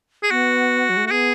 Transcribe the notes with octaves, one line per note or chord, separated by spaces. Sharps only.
G#4
B3 F#4
F#3
G#3
A3
F#4
B3 G#4